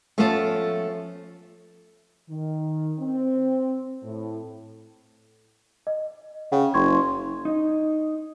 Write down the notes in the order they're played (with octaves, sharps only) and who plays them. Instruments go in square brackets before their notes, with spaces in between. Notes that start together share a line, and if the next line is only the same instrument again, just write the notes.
[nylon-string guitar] F3 A3 B3 C#4 F4 A4
[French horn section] D#3
C4
A2
[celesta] D#5
[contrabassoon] C#3 [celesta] F#5 G5
[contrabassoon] F#1 [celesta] C6 C#6 G#6
[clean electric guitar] D#4